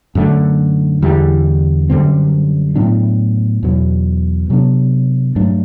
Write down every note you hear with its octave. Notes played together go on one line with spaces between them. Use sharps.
F#2 D3 A3
E2 D3 G3
F#2 D3 G3 C4
A2 F#3 B3 D4
E2 B2 F#3
C3 F#3 B3 D4
G2 F#3 A3 D4